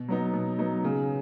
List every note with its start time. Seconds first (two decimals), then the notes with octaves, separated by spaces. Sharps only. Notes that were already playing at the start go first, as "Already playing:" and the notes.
Already playing: B2
0.08 F#3 B3 D#4
0.33 B2
0.58 F#3 B3 D#4
0.84 C#3